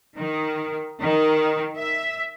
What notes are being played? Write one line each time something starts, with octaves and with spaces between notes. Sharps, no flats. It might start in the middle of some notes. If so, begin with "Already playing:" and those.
D#3
D#3
E5